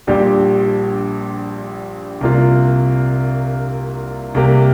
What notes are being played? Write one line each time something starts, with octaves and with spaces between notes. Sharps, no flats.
A#1 A#2 G3 D4 G4
C2 C3 A#3 F4
C2 C3 A#3 G4